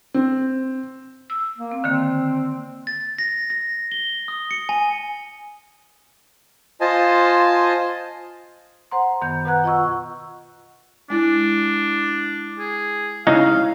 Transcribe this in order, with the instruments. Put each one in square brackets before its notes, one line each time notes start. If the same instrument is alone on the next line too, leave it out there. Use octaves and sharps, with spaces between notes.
[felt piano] C4
[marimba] E6
[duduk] A#3
[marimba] C4
[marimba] D3 D#3 A#3 [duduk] C4
[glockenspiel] A6
A#6
A#6
G7
D#6
C#7
G#5
[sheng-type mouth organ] F4 C5 D#5 G#5 A5
[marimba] C5 F#5 A#5 C6
F#2 D#3 B3 G6
B2 B4 F#5 A#5 F#6 G#6
F4 D#5 F#5 C#6 E6
[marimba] G#3 E4 [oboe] D4
[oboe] G#4
[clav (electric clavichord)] C#3 G#3 D#4 [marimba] E4 [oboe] F5